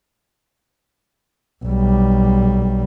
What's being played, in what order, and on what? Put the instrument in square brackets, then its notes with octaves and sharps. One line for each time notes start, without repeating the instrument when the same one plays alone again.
[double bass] B1 G3